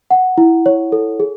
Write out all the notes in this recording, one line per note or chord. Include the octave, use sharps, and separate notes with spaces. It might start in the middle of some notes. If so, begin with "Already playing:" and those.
F#5
E4
C#5
A4
G#4